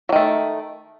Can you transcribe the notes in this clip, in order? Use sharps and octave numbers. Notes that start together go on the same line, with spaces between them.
D#3 F#3 A3